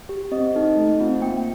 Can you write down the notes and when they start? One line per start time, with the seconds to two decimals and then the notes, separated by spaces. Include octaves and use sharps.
0.09 G4
0.32 C4 D#5
0.55 D#4 A4
0.77 A3
1.00 C4 F4
1.22 A#3 G5